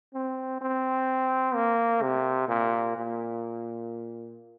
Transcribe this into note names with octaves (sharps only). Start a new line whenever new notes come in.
C4
C4
A#3
C3
A#2
A#2